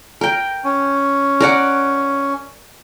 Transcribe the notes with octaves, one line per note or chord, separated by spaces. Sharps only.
A#4 G5
C#4
A#4 D5 F#5